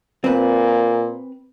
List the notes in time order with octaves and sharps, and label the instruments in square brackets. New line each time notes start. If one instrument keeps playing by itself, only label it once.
[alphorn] A#2 [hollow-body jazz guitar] C4 B4